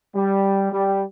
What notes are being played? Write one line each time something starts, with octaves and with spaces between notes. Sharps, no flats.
G3
G3